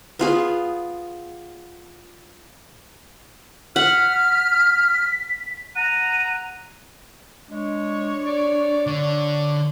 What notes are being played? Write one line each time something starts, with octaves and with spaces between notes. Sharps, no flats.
B3 F4 G#4
F#5 F6 B6
F#5 A#5 D#7
G#3 D4 C#5
D5
D3 D5